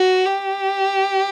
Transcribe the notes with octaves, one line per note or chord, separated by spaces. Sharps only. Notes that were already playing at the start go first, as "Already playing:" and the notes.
Already playing: F#4
G4